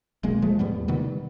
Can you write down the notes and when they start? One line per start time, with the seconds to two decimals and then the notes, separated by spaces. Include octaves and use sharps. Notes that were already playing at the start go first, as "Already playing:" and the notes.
0.23 D#1 B1 G#3 A#3
0.42 F3 G#3 A3
0.59 E2 A2 G3 B3
0.88 C3 D#3 G3 B3